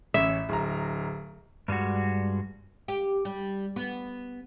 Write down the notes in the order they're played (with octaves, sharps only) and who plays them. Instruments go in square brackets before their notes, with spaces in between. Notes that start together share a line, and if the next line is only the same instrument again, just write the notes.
[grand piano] A1 C#4 [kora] E5
[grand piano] D1 A#5
[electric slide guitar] G2 G3 G#3 F#4
[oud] G4
G3
B3